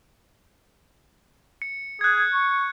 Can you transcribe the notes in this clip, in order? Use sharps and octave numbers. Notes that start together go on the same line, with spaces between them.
C#7
G#4 F#6 G#6
C#6